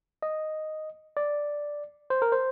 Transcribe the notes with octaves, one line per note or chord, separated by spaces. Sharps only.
D#5
D5
C5
A#4
C5